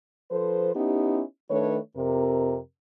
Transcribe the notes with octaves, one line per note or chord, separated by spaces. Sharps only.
F3 A4 B4 C5
B3 C#4 D#4 E4 G4
D#3 A3 D4 B4 C#5
F2 C3 A#4